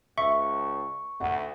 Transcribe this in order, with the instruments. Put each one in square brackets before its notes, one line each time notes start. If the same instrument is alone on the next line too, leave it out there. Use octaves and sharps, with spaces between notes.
[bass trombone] C#2 [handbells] E5 [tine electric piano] C#6
[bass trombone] D2 [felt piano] F#5